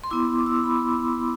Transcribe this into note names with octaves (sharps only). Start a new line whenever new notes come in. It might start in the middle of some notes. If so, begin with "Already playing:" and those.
C6
B3 E4 D6
D6
E6
D6
B5